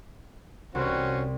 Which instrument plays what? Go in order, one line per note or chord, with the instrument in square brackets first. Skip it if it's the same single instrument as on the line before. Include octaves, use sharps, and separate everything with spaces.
[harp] C2 C4 [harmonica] C#4 F#4 C5